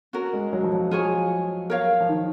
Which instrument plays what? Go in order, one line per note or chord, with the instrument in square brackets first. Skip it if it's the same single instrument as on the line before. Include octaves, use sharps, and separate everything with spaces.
[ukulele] C#4 F#4 A#4
[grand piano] G#3
F#3
F3
F#3
[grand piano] F3 [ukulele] F4 G#4 C#5 G#5
[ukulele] A#4 C#5 F5
[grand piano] F3
D#3